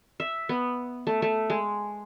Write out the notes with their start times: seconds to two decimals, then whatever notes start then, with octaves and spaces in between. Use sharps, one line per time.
0.20 E5
0.49 B3
1.07 A3
1.22 A3
1.50 G#3